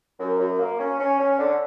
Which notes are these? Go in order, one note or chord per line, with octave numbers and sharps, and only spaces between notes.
F#2
F#2
A#3
C#4
C#4
C#4
D3